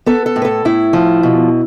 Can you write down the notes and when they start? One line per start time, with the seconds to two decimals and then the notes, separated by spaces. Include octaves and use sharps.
0.06 B3 A4
0.26 A4
0.36 A2
0.42 B4
0.45 A4
0.65 A2 E4
0.93 F3
1.23 B2